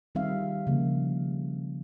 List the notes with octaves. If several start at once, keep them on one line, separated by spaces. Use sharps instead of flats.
D#3 G3 C4 D#4 E5 F5
C#3 F3 A#3